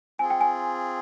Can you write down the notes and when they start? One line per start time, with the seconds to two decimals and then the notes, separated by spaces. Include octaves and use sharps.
0.19 C4 F4 G#4 G#5
0.30 G5
0.41 G#5